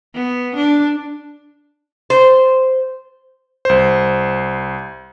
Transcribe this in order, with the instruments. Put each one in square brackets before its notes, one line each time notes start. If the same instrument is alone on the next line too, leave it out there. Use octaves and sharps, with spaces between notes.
[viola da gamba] B3
D4
[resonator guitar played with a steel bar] C5
[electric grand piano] C2 C5